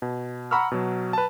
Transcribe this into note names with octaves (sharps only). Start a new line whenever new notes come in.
B2
F#5 A#5 B5 C#6 E6 F6
B2 F#3
B4 A5